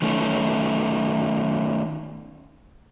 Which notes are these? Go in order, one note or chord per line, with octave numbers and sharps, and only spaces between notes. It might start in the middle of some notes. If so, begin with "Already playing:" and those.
D#3 A3 C#4